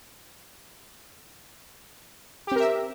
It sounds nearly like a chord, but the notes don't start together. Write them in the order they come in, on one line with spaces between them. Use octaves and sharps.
G4 C4 A#4 E5